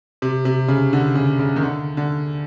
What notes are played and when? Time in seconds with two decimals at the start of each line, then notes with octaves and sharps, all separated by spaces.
0.22 C3
0.45 C3
0.68 C#3
0.93 D3
1.15 C#3
1.39 C#3
1.56 D#3
1.62 D3
1.97 D3